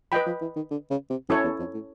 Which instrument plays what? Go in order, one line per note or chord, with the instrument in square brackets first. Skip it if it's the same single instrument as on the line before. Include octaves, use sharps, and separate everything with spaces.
[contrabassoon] F3 [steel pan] B4 D#5 G5 B5
[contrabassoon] F3
E3
D#3
D3
C#3
C3
[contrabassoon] F#2 [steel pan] C#4 E4 A4 C#5
[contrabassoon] E2
F2
A2